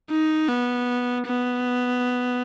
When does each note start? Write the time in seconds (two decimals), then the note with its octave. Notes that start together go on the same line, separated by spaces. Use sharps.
0.11 D#4
0.48 B3
1.26 B3